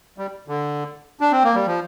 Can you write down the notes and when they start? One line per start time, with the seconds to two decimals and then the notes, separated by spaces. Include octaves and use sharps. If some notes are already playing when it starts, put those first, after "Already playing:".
0.18 G3
0.48 D3
1.20 D4
1.32 C4
1.44 A#3
1.55 G3
1.67 F3